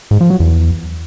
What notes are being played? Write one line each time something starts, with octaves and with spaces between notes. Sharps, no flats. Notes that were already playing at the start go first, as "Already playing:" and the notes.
G#2
F3
F#3
E2